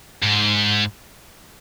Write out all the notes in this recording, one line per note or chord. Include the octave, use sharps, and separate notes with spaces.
G#2